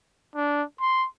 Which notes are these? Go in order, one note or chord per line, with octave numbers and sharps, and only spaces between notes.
D4
C6